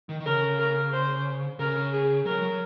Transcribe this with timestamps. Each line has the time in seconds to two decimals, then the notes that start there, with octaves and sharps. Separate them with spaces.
0.09 D#3
0.20 D#3
0.26 C#3 A#4
0.59 A#4
0.92 C5
1.59 C#3 A#4
1.93 G#4
2.25 F#3 A#4
2.42 F#3